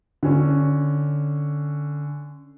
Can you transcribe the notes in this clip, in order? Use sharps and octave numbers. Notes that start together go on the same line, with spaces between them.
D3 C#4